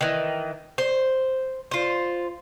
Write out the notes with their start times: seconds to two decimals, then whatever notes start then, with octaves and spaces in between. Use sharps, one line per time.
0.01 D#3 E3
0.78 C5
1.71 F4 C5